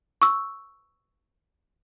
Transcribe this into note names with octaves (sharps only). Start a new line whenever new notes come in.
C#6 E6